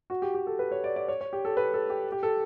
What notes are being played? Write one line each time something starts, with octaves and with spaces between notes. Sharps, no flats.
F#4
G4
G4
A4
B4
C#5
D5
D5
C#5
C#5
G4
A4
B4
A4
G4
G4
A4